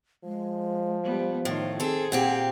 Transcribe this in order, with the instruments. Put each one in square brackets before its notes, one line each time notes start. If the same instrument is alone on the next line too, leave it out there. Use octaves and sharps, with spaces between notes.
[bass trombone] F3 [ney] G#3
[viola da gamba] G3 B3
[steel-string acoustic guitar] A2 [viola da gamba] D#3 F4
[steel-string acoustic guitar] C4 A4 [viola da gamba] G#4
[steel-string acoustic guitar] A#2 C4 G4 [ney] F#5